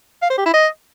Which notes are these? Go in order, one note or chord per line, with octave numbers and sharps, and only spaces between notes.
F5
C5
G4
E4
D#5